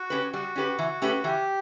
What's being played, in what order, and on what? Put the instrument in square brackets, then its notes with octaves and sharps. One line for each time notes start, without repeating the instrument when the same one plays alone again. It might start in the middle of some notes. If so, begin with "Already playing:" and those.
Already playing: [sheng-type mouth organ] F#4
[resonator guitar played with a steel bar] C#4 G4 B4
[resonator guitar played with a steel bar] G3 [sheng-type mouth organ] F#4
[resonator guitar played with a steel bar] C#4 G4 B4
E3
A3 C#4 G4 B4
[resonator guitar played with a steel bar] E3 [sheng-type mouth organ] G4